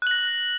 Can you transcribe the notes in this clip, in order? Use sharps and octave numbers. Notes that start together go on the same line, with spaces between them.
F#6 A#6 F#7